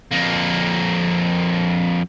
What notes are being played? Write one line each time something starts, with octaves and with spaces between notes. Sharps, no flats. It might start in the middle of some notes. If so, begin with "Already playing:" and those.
F2 A#3